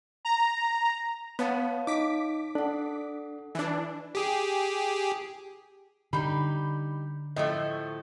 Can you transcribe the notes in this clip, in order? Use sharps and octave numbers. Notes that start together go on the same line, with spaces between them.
A#5
B3 C#5 F5 A5
D#4 D6 B6
D4 A4 F#5
E3 D4
G4 G#4
D3 G3 D#4 B5
A2 F3 A3 D#5